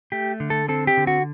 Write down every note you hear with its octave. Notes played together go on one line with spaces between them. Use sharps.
A3 G4
D3
A4
C4 A4
G4
D3
F#4